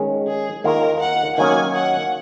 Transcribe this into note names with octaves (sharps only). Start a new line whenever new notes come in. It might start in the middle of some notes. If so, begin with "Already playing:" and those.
Already playing: D#3 G#3 C#4
G#4
D#2 D#3 A#3 F4 A#4
F#5
D#3 F#3 A#3 C#4 G#5
F#5